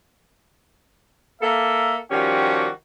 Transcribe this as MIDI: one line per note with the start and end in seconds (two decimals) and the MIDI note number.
1.42 1.97 58
1.42 1.97 69
1.42 1.97 76
2.11 2.67 51
2.11 2.67 53
2.11 2.67 55
2.11 2.67 61
2.11 2.67 66
2.11 2.67 67